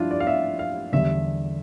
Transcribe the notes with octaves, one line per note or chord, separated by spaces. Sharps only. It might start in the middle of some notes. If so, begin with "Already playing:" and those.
Already playing: G2 F3 D4 E4 F4
D5
F5
E5
F5
E2 D3 G3 E5